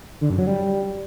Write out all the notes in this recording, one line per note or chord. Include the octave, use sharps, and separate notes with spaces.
D3
F#2
F#3
G3